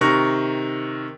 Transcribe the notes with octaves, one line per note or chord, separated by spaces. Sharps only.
C3 D#3 A#4 C#6 F#6 A#6